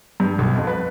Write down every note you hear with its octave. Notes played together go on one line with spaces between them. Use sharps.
G2
B1
F2
B4